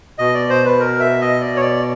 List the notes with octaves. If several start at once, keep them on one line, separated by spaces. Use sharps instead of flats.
B2 D#5
D5
C5
B4
A#4
E5
D#5
D5
C#5
D5